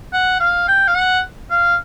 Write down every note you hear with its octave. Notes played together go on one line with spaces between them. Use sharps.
F#5
F5
G5
F5
F#5
F5